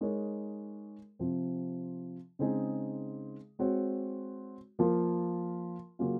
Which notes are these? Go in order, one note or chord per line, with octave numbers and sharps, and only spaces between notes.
G#3 D#4 A#4 C#5
C3 F3 C4
C#3 G#3 C4 D#4 G#4
G#3 C4 F#4 C#5
F3 A#3 F4 A#4
C#3 F#3 A#3 C#4 F4